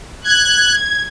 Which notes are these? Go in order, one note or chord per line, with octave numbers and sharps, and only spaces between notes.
F#6 G#6